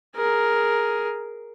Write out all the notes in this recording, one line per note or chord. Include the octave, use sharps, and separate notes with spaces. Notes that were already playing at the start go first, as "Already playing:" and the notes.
G#4 A#4